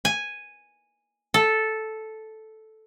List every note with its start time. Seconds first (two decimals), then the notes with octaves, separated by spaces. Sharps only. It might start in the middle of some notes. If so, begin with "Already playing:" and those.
0.05 G#5
1.34 A4